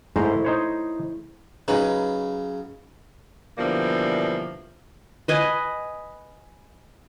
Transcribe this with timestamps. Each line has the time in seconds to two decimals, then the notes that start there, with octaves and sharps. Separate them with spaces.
0.16 G#2 A3 E4 C5 A#5
0.45 D#4 C5 C#5
1.68 C#3 F#3 G#3 D#4 B4
3.58 B2 D3 E3 F3 G3 A#3
5.28 B4 D#5 G#5